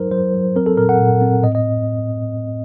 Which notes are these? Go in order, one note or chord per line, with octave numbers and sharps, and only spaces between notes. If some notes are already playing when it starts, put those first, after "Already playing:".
Already playing: F#3 D#4 A#4 C5
F#3 C5
F#3
C4 A#4
A4
A#2 A#4
F#5
A#2
C4
A2 D#5
D#5